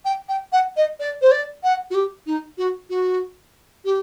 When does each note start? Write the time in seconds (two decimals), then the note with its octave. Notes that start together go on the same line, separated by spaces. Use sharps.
0.05 G5
0.29 G5
0.53 F#5
0.77 D#5
1.00 D5
1.22 C5
1.31 D5
1.64 F#5
1.90 F#4
1.94 G4
2.27 D#4
2.58 F#4
2.90 F#4
3.85 G4